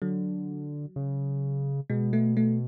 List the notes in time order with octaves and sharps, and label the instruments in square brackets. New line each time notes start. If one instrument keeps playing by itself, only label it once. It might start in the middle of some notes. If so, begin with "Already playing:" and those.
[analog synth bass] D3 [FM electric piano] F#3
[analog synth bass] C#3
[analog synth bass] B2 [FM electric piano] G#3
[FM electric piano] A3
A3